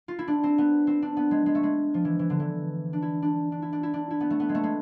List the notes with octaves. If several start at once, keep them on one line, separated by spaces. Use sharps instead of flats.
F4
E4
D4
C4
B3
C4
D4
B3
G#3
G#3
A3
G#3
F3
E3
E3
D3
E3
D4
E4
D4
D4
E4
D4
E4
D4
E4
B3
A3
B3
G#3
A3
G#3